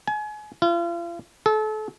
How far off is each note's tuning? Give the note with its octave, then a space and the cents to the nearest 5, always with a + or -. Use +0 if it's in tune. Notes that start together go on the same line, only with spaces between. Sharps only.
G#5 +30
F4 -40
A4 -35